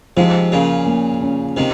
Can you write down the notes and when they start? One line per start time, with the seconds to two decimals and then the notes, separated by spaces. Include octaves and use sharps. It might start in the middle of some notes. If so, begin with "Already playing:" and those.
0.17 G#2 C3 F3
0.52 A#2 C#3 C#4
0.86 A#3
1.21 C#4
1.56 C3 D#3 C4